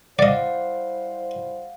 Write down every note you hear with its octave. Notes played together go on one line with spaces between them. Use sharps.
G3 E4 C5 D5 D#5 F5 F#5